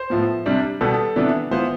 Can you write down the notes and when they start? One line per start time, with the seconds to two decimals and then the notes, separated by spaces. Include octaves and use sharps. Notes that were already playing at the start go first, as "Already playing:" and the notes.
Already playing: C5
0.10 A2 F3 B3
0.46 C3 G3 D4
0.81 B2 G3 B3 A4
1.16 C3 E3 B3 D4
1.51 E3 B3 F4 C5